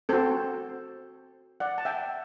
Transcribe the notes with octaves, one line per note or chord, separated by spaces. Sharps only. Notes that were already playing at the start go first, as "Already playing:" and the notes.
C4 F#4 A4 C5
D5 F#5
A5
E5 G5